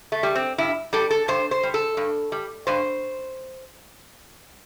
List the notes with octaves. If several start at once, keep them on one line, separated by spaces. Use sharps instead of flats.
A3
G3
C4
G2 E4
G3 A4
A4
G2 C5
C5
G3
A4
G2
G3
G2 C5